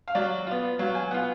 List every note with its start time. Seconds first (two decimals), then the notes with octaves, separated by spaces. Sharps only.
0.08 F5
0.15 F#3 D5
0.47 B3 F4
0.79 F#3 F5
0.95 G#5
1.11 B3 F4 F#5